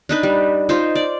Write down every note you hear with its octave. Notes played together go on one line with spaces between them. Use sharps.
D4 D#4 B4
G3
D#4 F4 C5
D5